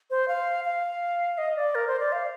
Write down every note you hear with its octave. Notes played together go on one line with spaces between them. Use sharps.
C5
F5
F5
D#5
D5
A#4
C5
D5
F5